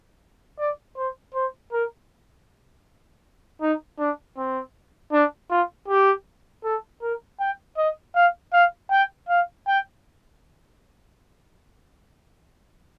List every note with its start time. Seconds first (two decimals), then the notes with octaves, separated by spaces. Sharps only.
0.59 D5
0.96 C5
1.34 C5
1.72 A#4
3.61 D#4
3.99 D4
4.37 C4
5.12 D4
5.50 F4
5.88 G4
6.64 A4
7.02 A#4
7.39 G5
7.78 D#5
8.15 F5
8.53 F5
8.91 G5
9.29 F5
9.67 G5